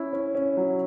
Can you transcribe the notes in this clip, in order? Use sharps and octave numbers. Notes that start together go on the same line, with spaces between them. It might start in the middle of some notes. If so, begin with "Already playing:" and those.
Already playing: C#4 E4
C#4
C#4
F#3